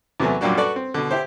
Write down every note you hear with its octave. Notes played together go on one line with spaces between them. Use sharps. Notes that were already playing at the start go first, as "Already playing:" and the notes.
E2 C3 F#3 A3 B3 G#5
F#2 A#2 G3 A#3 D4 F#4
F#4 A4 B4 D5
C4
B2 D3
E4 G4 C5